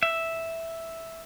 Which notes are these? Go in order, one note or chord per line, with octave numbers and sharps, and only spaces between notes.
E5